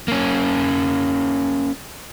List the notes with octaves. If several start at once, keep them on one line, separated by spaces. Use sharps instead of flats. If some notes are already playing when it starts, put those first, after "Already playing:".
A#3 C#4